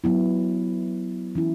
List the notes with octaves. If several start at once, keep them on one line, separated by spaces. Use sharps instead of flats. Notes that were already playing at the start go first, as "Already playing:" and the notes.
F#3 B3 E4
E3 C#4 E4